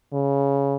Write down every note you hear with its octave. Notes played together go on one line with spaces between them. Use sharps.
C#3